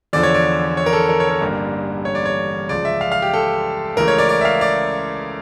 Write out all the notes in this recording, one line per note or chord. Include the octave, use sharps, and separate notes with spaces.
E2 D3 F3 D5
C#5
D5
C#5
A#4
A4
A#4
C#5
A#4
A1 G2 D3 G3 A#3
C#5
D5
C#5
C#2 C#3 F3 D5
E5
F5
F5
G4
A4
C#2 C#3 E3 A3 A#4
C#5
D5
D5
E5
F5
D5